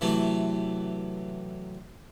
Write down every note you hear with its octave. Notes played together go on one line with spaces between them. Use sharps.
C3 E3 F#3 A3